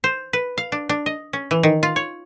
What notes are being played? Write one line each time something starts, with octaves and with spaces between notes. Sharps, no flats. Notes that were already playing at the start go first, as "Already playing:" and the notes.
C5
B4
F5
D4
D4
D#5
C#4
E3
D#3
F4
C#5